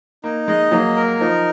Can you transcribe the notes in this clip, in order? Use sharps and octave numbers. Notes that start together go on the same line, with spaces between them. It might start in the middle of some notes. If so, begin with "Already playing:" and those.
A#3 D#4
G#3 D#5
F#3 A#3
A#4
F3 D#4